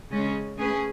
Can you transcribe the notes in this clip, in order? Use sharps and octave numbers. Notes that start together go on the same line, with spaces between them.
C#3 G#3 C#4
A3 C#4 G#4 B4